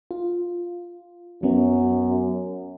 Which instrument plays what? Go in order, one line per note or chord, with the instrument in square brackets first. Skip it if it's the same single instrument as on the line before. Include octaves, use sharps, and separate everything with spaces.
[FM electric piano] F4
[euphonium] F#2 [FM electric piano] F#3 B3 C#4